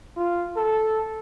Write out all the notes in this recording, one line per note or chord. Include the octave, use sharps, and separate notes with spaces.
F4
A4